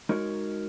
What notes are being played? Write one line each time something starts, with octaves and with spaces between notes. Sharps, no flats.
G#3 D#4 F#4 A#4 C#5